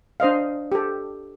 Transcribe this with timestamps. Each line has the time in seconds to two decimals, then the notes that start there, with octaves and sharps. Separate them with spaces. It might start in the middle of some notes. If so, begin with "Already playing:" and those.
0.20 D4 C5 D#5 F5
0.72 G4 A4